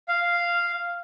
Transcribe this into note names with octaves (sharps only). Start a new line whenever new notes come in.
F5